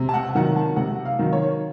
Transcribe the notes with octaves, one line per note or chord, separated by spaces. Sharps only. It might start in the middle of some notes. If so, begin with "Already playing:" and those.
Already playing: C3
A5
F#5
D#3 F#3 F#5
A5
C3 F#5
F5
D#3 F#3
C#5